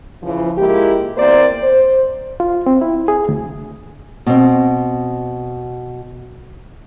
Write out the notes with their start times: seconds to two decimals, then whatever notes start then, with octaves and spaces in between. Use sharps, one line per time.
0.23 C#3 E3 F3
0.58 G#3 A#3 E4 F4 G4
1.18 E2 A#3 C4 A#4 C5 D5
1.63 C5
2.40 F4
2.66 C4
2.81 E4
3.08 G#4
3.29 D2
4.26 B2 C4